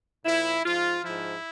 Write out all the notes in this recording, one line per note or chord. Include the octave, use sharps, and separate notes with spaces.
A#2 F3 E4
G#2 F3 F4
G#2 F3 E4